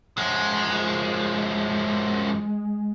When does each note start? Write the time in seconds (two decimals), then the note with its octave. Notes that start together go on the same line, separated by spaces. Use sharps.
0.18 F#2 F3 G#3